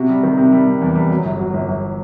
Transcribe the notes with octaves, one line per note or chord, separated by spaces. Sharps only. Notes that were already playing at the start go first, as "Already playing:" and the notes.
Already playing: C3 F#4
G3
D#3
C3
G3
C3
E2
G3
F#3
G1
F#3
G1
G1